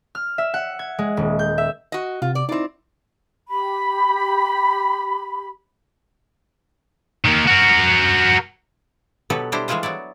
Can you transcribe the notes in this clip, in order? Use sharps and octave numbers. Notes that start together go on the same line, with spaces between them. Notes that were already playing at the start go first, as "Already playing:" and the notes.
F6
E5
F#5
G#6
G#3
D#1
G6
E5
F#4 D#5
C3 F4
D5
C4 D#4 E4 D5
G4 B5
D#3 A#3
F#4 A#4
B2 F#3 B3 G4 A4 B4
G3 D4 E4 G4 C5
E3 G3 G#3 E4 F4 C5
F#3 B3 E4 D5